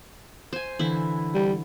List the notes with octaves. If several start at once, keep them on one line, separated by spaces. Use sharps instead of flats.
C5 G#5
D3 E3 E4
G3